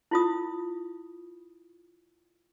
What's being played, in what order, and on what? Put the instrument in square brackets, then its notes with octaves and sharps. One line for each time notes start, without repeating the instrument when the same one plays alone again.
[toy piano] E4 F4 D#6